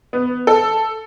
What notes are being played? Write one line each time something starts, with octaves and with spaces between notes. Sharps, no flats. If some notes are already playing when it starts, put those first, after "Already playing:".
B3
A4